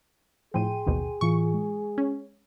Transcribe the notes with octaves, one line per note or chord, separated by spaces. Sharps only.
A2 F3 G#4 G5 C6 D#7
A1 D#2 B2
A2 E3 F4 C#6
G#3
C#4